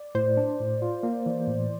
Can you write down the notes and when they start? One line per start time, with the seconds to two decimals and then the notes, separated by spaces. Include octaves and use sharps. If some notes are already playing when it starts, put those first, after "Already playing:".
Already playing: D5
0.15 A2 C5
0.37 D4
0.60 A2
0.82 F4
1.03 A#3
1.26 E3
1.48 A2